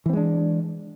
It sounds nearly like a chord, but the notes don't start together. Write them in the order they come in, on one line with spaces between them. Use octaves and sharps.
E3 C4 G#3 D4